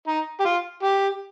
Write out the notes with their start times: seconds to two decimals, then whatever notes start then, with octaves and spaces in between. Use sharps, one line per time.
0.08 D#4
0.40 G4
0.45 F4
0.83 G4